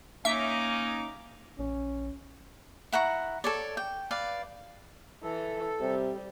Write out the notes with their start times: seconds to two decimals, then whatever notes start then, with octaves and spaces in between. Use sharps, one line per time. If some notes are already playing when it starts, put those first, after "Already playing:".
0.25 A#3 C#4 D#4 E5 D6
1.59 A#1 C#4
2.92 E4 F#5 A#5 C#6
3.44 A4 C#5 D5
3.77 G5
4.11 B4 D5 F5
5.23 E3 A4
5.81 C3 G3